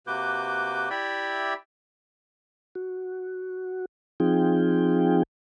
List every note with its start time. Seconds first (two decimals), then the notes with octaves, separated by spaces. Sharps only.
0.07 C3 A#3 F#4 B4 D6 G6
0.90 E4 G4 D5 E5 G5 B5
2.75 F#4
4.20 F3 C4 D#4 F4 G#4 G5